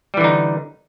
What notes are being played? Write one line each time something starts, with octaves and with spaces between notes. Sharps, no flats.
D3 E3 G3 D#4